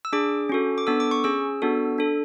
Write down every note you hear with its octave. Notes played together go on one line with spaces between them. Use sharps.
E6
D4 G#4 D6
C#4 F#4 A4
D6
B3 D4 A4 E6
D6
C#6
C#4 G#4 E6
B3 D4 F#4 A4
D4 A4